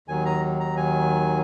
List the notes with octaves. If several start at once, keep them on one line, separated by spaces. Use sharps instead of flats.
D#2 D#3 F#3 G#5
A#5
A#5
G#5